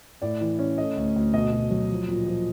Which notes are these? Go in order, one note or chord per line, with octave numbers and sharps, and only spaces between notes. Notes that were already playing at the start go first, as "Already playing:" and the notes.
A2 D5
E3
C#4
A3 D#5
D2
D2
B2 D#5
B2
F#3
F3
A#2
F3